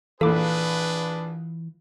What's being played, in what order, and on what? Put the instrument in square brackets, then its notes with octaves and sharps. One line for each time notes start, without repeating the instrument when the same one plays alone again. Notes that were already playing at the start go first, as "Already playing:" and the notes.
[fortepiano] A#1 A#3 [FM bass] E3 [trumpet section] D4 G#4 B4 [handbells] A4 D6